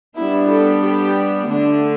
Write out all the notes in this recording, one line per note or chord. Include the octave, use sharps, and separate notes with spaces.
G3 B3 D4 E4
A4
G4
D3 A3 D4